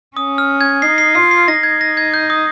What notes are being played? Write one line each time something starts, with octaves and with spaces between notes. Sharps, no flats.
C#4 D#6
F6
G#6
D#4 C7
C7
F4 C7
C7
D#4 A#6
G#6
A#6
G#6
G6
D#6